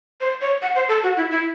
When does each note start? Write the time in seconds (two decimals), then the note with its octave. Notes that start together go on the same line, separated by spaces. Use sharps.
0.21 C5
0.41 C#5
0.62 F#5
0.75 C5
0.88 A4
1.03 F#4
1.17 E4
1.31 E4